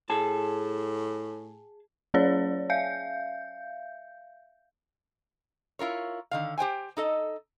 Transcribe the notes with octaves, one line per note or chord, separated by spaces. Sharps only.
A2 G#4 A5
F#3 C#4 G#4 C#5 D5
E5 F5 G6
E4 F4 A#4 C#5
D3 D#3 F5
G4 C5 G5 G#5
D#4 A4 D#5